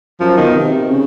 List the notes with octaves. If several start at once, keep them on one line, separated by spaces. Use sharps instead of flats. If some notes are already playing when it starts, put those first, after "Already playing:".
F#2 F3
B2 D#3
C3
C3
C#3